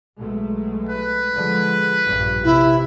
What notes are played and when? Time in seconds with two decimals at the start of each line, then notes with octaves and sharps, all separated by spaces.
0.17 B1 G#3 A3
0.89 B4
1.34 D3 F3 G#3
2.05 A#1 G2
2.44 C3 E4